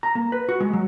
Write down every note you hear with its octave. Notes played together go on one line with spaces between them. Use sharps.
A#5
A#3
B4
F#4
G#3
F#3